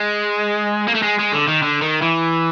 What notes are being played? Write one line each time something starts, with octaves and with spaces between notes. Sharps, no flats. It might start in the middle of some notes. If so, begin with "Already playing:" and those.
Already playing: G#3
A#3
A3
G#3
G#3
D3
D#3
D3
D#3
E3